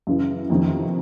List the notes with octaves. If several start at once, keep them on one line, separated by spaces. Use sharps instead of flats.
F#2 C#3 E3
F2 C3 D#3